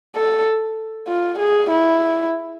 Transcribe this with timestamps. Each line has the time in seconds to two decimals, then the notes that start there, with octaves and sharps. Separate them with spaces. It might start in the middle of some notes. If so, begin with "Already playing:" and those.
0.16 A4
1.08 F4
1.39 G#4
1.70 E4